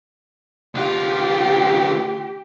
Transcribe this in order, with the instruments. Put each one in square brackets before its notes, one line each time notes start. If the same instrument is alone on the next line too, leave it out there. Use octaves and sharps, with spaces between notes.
[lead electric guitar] D2 F4 [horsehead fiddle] G4